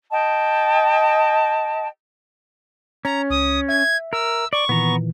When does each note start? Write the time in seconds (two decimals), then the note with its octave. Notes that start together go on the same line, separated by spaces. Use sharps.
0.10 D#5 G5 A5
3.05 C#4 A#5
3.30 C#2 D#6
3.69 E5 G#6
4.13 A#4 E6
4.53 D5 C#6
4.69 A#2 D#3 E3 B3 A#5